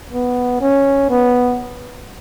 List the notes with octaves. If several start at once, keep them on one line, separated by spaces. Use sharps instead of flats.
B3
C#4
B3